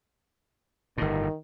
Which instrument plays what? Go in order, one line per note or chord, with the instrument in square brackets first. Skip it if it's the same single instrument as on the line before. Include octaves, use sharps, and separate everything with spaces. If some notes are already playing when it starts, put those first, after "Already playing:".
[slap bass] G1 A2 [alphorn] D#3